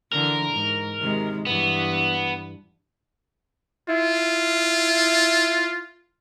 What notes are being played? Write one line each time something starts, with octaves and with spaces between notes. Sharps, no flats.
D3 E3 A#4
G#2
C3 D#3 G#3
G2 E3 B3
E4 F4